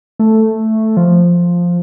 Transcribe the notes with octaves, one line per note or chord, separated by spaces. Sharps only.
A3
F3